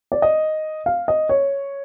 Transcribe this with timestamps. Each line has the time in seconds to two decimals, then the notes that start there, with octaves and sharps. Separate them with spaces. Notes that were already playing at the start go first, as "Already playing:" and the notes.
0.12 D5
0.22 D#5
0.86 F5
1.08 D#5
1.29 C#5